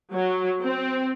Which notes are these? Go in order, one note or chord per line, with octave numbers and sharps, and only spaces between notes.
F#3
C4